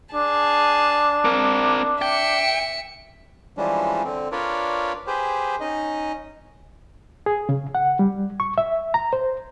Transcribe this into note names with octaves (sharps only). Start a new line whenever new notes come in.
D4 G#4 A5
C4 A#4
E5 G5 C#7
E3 F3 G3 G#3 C#4 D4
D3 C4
D4 F4 A#4 B4 C#5 D5
G4 G#4 B4 C5
C#4 D#4 D#5
G#4
C#3
F#5
G3
C#6
E5
A#5
C5